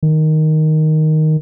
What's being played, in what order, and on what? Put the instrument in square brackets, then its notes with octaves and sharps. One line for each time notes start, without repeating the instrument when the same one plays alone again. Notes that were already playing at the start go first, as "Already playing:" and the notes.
[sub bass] D#3